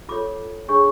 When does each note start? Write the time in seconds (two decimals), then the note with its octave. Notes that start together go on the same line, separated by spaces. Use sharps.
0.09 F4 A4 C#5 D6
0.69 D4 G#4 C#5 C#6